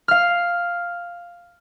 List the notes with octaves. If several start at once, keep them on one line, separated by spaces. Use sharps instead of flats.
F5 F6